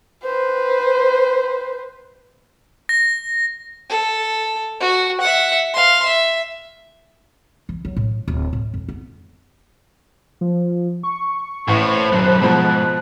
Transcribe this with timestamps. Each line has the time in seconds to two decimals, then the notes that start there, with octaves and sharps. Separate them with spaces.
0.23 B4 C5
2.89 A#6
3.90 A4
4.80 F#4
5.21 E5 F#5
5.73 F5 C6
6.06 E5
7.69 E3
7.85 F#3
7.97 A2
8.28 D1
8.53 A2
8.74 F2
8.88 B3
10.41 F3
11.03 C#6
11.68 A1 A2 A4 C5 B5
12.12 B1 F#2 F#6
12.42 G#2 B2 F3